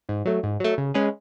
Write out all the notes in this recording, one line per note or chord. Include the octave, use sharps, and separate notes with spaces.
G#2
F#3 A3
G#2
F#3 A3
C#3
G#3 C#4 G#4 B4